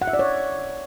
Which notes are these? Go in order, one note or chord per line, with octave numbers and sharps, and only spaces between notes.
F#5
E5
D5
C#5